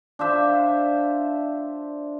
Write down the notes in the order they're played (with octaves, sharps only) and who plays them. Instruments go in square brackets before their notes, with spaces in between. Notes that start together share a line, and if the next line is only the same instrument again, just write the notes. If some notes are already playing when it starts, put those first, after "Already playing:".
[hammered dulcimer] D4 F4 C5 E5